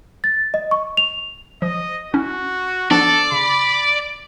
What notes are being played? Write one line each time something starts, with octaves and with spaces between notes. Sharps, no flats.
A6
D#5
C#6
F7
F3 D#5
C#4 E4 F#4
F3 B3 D4 A4 D5
C#3 B5